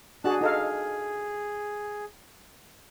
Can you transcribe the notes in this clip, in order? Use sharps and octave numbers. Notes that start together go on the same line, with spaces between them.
D4 F#4 G#4 A5 F#6
D#4 G#4 A4 F5